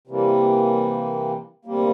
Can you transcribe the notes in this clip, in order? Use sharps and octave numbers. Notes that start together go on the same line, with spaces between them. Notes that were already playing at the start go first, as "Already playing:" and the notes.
C3 E3 G3 A#3
D2 C3 G3 A#3